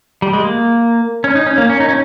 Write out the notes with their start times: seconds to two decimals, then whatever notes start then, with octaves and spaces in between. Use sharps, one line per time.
0.22 G3
0.33 G#3
0.44 A#3
1.24 C#4
1.35 D#4
1.46 C#4
1.58 A#3
1.69 C#4
1.80 D#4
1.89 C#4